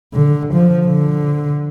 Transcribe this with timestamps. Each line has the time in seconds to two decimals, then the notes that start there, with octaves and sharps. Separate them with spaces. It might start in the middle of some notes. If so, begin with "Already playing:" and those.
0.14 D3
0.54 F3
0.87 D3